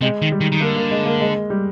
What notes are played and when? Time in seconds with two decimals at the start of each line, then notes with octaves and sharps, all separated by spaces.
0.01 C3 G#3
0.22 D#3
0.32 G3
0.41 D#3
0.52 D#3
0.61 D3 A#3
0.76 A#3
0.91 G#3
1.06 A#3
1.21 G#3
1.50 G3